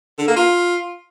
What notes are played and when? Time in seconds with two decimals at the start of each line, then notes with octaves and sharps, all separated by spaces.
0.18 D3
0.27 A#3
0.36 F4